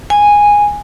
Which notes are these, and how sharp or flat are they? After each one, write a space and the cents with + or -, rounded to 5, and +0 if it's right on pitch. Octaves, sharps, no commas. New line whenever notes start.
G#5 -10